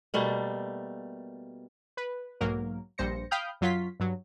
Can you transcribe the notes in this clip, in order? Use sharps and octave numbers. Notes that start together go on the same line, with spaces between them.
B2 G3 A3 A#3
B4
B1 G#2 F#3 A#3 A#4
A#1 G2 C5 A#6 C#7
F5 G5 B5 D#6 F6 G6
F#2 F#3 F4 C#5 C6 B6
G2 F#3